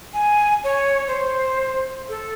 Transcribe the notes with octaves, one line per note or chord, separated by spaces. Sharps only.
G#5
C#5
C5
A4